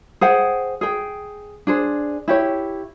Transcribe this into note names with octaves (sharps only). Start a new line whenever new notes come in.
G#4 C5 F#5 G5
G#4 G5
D4 G#4 C5
E4 G4 C#5